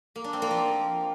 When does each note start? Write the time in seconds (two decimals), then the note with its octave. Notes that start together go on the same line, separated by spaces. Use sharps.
0.16 A#3
0.24 D4
0.33 C4
0.42 A#3
0.51 F3